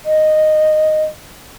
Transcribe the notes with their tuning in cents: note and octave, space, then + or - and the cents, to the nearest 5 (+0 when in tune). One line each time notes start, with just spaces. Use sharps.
D#5 -10